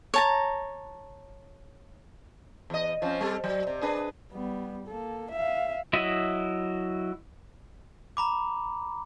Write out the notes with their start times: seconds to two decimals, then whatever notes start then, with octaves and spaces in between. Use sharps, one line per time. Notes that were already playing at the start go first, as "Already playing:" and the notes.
0.14 C#5 A5 A#5
2.70 E2 D#5
3.02 F3 C4 C#4
3.21 G3 C4 A4
3.44 F#3
3.67 C3
3.82 D4 G#4 B4
4.32 G3 B3
4.87 A#3 A4
5.31 E5 F5
5.93 F#3 E4 D#5 E5
8.17 A#5 B5 D6